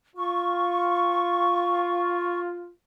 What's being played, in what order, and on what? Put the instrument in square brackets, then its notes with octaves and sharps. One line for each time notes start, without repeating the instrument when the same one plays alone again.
[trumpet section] F4 [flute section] C#6